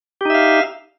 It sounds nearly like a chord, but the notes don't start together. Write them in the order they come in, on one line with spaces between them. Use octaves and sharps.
G4 D#4 E5 F5